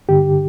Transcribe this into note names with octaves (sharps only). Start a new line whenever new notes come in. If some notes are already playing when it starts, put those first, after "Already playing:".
G2 D3 G4